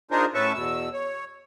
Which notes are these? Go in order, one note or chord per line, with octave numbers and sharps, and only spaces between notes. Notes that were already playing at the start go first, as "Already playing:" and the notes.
D4 D#4 F4 G#4 A#4 C5
A2 C#4 B4 E5 A5 C#6
E2 B2 E6
C#5